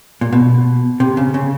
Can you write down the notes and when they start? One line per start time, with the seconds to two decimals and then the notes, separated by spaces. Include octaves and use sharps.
0.21 A#2
0.32 B2
1.00 C3
1.17 C#3
1.34 C#3